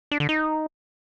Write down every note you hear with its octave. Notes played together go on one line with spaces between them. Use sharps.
D4
D3
D#4